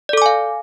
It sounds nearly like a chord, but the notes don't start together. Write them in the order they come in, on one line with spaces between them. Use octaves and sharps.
D5 A4 D6 G#5 F5